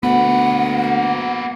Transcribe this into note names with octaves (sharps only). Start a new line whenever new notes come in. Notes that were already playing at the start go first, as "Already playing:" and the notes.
D2 A#3 B3 B4 F#5